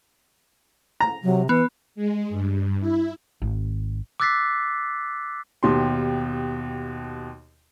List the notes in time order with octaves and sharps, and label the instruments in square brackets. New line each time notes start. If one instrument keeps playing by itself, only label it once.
[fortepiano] A#5
[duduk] C3 [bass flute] F#3
[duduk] E3 [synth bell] B3 [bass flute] B4
[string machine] G#3
G2
E4
[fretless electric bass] G#1
[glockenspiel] D6 E6 F#6 A6 B6 C7
[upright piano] D#2 B2 G4 C6